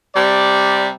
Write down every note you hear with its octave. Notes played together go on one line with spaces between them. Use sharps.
C3 G3 D5